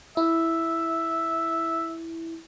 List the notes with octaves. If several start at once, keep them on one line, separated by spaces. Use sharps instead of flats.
E4 E5